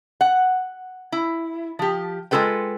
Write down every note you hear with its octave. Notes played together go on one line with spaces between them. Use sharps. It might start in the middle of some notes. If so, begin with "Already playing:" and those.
F#5
E4
F3 G4
G#3 C4 F4 A4 B4 G5